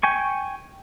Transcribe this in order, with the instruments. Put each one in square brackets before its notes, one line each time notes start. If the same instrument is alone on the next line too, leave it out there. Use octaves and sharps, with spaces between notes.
[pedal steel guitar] G5 G#5 C#6